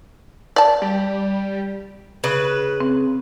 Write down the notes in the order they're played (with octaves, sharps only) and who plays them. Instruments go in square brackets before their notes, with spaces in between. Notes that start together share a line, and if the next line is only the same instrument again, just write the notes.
[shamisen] D5 A5
[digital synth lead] G3
[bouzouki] C#3 B4
[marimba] C4